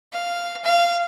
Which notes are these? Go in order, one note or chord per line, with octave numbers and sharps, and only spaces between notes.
F5
F5